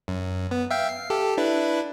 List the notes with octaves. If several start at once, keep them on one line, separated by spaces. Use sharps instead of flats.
F#2
B3
E5 F5 G5
C7
G4 A4
D4 E4 B4